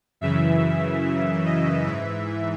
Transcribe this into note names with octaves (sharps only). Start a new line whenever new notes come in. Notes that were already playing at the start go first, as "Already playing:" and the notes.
F#2 C#3 E3 E5
D#5
G#2 E3 E5